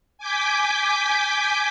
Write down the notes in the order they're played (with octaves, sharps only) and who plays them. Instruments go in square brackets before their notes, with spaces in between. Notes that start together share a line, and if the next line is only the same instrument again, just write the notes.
[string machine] G#5 D6 G6 B6